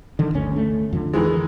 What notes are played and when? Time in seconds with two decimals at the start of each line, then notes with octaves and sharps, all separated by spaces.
0.19 D3 D#3
0.34 G1 D2 C#4
0.56 A3
0.93 F2 D3
1.13 D#3 E3 G#3